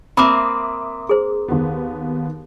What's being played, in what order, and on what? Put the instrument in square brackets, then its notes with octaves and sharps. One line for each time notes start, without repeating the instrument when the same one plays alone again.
[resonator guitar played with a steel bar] A#3 C4 [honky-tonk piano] E5 D6 D#6 [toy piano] B5
[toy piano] G#4 C5
[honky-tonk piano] D#2 B3